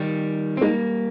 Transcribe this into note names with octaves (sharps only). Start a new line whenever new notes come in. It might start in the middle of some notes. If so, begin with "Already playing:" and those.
Already playing: D#3 G3
C4
G3 G#3 A#3 D#4 G#4